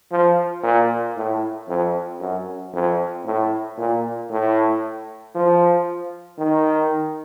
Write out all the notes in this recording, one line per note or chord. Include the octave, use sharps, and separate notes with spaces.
F3
A#2
A2
F2
F#2
F2
A2
A#2
A2
F3
D#3